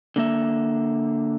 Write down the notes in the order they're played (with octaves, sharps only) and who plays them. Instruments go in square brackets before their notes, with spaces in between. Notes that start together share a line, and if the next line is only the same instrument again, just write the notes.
[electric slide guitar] D3 A#3 E5